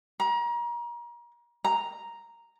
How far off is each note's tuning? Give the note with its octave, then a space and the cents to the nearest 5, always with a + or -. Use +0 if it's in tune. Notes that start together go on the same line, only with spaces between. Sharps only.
A#5 +35
A#5 +0